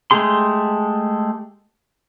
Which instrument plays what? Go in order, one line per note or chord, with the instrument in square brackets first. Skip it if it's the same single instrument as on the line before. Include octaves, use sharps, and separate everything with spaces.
[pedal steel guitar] G#3 A3 G4 G#4 C6